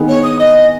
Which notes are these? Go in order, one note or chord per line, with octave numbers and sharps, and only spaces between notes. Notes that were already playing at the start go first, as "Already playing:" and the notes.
Already playing: D#3 B3 G#4
C#5
D#6
D#5